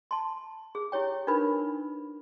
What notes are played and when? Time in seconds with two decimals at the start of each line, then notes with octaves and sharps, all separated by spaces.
0.11 A5 C6
0.75 G#4
0.92 E4 G4 C#5 G5
1.27 D4 D#4 F4 A#4 B4 B5